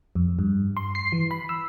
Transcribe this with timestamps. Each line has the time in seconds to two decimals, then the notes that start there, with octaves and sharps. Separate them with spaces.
0.15 F2
0.39 G2
0.77 C6
0.95 C7
1.12 E3
1.31 B5
1.49 E6